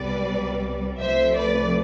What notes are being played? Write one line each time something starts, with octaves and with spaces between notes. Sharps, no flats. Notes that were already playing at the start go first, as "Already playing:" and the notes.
Already playing: C2 B2 G3 B4 D5
C2 C3 F3 A3 C5 E5
B4 D5